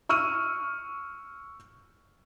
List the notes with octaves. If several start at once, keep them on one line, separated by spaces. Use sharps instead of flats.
C#6 E6 F6 D#7